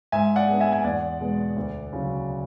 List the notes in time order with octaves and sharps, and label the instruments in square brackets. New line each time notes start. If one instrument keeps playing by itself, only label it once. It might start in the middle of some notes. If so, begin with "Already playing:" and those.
[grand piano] G#2 E5 G#5
D5 F#5
G#3 B3 D4
E5 G#5
G#5
E2 D5 F#5
B2 G#3 B3
D2
C#3 F#3